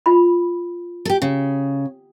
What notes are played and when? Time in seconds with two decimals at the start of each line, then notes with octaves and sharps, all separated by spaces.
0.06 F4 B5
1.05 G4 A4
1.22 C#3